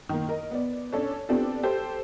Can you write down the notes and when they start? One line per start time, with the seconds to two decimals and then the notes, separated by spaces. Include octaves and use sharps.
0.09 D#3 A#3
0.29 A#4 D#5
0.51 B3 D5
0.93 C#4 D4 A4 C#5
1.29 B3 C4 D4 F4 G4 A4
1.63 G4 A4 C5